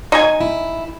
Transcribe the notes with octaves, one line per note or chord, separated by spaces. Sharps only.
D#4 G#5
E4